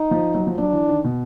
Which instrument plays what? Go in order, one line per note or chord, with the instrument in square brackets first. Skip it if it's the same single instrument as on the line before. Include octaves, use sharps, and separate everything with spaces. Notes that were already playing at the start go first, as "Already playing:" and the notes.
Already playing: [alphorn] D#4
[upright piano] F3
F#3
F3
[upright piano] F#3 [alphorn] D4
[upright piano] E3
D#3
B2